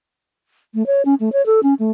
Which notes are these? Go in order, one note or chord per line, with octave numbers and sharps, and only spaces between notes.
A3
C#5
C#4
A3
C#5
A4
C#4
A3